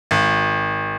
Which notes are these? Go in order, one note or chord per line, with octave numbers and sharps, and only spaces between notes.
G#1